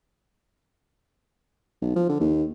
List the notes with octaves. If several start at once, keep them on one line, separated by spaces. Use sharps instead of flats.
B1
F3
D3
D#2